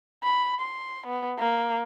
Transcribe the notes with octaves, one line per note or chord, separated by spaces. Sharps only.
B5
C6
B3
A#3